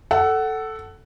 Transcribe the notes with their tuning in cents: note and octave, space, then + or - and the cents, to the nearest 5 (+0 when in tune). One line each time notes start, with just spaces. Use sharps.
A4 +0 F#5 +20